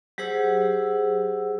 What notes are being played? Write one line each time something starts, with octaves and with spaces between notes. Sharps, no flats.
F#3 G4 G#4 C5 F#5 E6